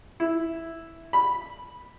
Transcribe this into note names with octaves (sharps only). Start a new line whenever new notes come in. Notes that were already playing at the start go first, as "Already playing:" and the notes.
E4
B5